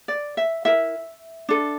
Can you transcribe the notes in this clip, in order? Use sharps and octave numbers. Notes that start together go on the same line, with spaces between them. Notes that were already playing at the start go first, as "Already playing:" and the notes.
D5
E5
E4 A#4 E5
D4 A4